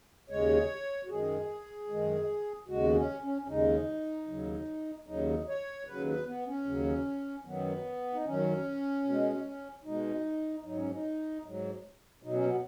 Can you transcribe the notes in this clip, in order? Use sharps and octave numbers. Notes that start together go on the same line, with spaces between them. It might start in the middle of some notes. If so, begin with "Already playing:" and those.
D#2 C#3 G#3 C#5
F#4
F#2 D#3 G#3 G#4
F#2 D#3 G#3
D#2 C#3 G#3 F#4
B3
C#4
C#4
C#4
D#2 C#3 G#3 D#4
D#2 C#3 F#3
D#2 C#3 F#3 D#4
C#5
D#2 C#3 F#3 B4
B4
B3
C#4
D#2 C#3 F#3
F#2 D#3 F#3 B3
D#4
F#2 D#3 F#3 C#4
B2
G#3
B2 G#3 D#4
G#2 F#3 D#4
C#4
D#4
G#2 F#3
B2 F#3 D#4
C#4
B3